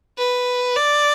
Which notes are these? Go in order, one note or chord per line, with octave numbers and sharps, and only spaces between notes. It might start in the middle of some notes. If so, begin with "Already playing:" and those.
B4
D5